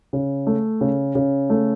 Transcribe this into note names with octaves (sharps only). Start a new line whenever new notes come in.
C#3
A3
C#3
C#3
A3